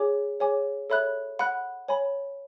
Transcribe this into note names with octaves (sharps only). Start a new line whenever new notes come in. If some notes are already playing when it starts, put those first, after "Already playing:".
Already playing: G#4 C#5 G#5 D6
G#4 C#5 G#5 D6
A4 C#5 E5 B5 F#6
F#5 B5 F#6
C#5 G#5 B5